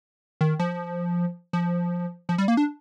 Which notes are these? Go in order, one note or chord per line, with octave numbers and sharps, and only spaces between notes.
D#3
F3
F3
F3
G3
A#3
D4